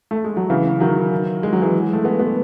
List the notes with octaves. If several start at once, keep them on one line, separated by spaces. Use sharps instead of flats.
A3
G#3
F#3
C#3 E3
D#3 F#3
G#3
F#3
E3 G#3
A3
G#3 B3
G#3 B3